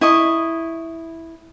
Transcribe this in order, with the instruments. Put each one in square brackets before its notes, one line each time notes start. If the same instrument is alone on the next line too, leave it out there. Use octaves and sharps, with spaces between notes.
[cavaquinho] E4 D#5 C#6